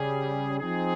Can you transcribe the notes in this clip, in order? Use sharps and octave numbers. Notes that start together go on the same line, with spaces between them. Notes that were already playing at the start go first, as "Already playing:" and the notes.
Already playing: C#3 G3 C#4 G#4
F3 C4 D#4 G#4